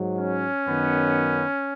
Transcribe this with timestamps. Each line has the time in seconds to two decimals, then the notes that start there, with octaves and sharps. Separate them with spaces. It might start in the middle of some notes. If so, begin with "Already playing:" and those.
Already playing: G#2 F#3
0.19 C#4
0.67 F#2 D#3 B3